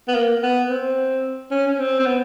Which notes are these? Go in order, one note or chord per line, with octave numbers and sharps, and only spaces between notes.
B3
A#3
B3
C4
C#4
C#4
C4
C4
B3